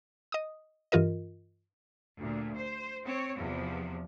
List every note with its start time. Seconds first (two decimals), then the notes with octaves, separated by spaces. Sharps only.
0.32 D#5 D#6
0.92 G2 E3 F4 A#4 D#5
2.18 D2 A#2
2.56 C5
3.04 C4 C#5
3.37 E2 C3 F3